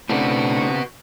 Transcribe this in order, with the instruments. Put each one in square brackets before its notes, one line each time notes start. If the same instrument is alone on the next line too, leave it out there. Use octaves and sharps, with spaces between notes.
[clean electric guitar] A2 D4 [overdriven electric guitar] C#3 C4 [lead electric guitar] B3 F#4